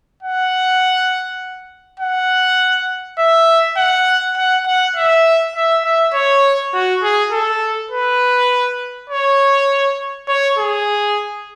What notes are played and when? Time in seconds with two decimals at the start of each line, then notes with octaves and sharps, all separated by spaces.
0.23 F#5
1.99 F#5
3.19 E5
3.77 F#5
4.37 F#5
4.66 F#5
4.96 E5
5.55 E5
5.84 E5
6.14 C#5
6.74 F#4
7.03 G#4
7.32 A4
7.91 B4
9.10 C#5
10.28 C#5
10.58 G#4